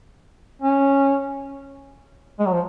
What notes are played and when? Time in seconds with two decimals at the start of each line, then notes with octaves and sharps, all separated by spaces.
0.62 C#4
2.39 G#3
2.46 F#3
2.53 F3